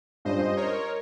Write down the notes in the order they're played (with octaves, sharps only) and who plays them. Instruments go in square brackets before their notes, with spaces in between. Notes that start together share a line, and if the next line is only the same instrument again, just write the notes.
[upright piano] G2 G3 C#4 F4 [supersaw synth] C5 D#5
[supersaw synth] A#4 C#5